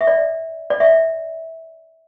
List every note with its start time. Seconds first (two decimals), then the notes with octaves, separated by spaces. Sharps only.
0.01 E5
0.07 D5
0.70 D5
0.80 E5